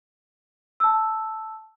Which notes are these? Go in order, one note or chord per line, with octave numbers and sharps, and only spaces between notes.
A5 E6